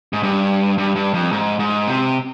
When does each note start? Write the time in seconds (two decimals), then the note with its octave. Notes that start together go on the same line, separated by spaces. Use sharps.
0.13 G#2
0.23 G2
0.78 G2
0.96 G2
1.14 F2
1.32 G#2
1.59 G#2
1.88 C3